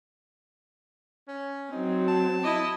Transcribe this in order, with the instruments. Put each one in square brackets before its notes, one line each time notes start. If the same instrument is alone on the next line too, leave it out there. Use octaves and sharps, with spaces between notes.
[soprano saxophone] C#4
[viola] F#3 C4 [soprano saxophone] D#4
[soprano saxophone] A5
[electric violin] E4 D#5